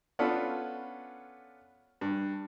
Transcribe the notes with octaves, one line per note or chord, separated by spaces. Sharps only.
B3 C#4 D4 F4 A4 B4
G2